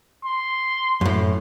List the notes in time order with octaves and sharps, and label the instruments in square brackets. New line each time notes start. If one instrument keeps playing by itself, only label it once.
[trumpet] C6
[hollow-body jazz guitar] F#2 A2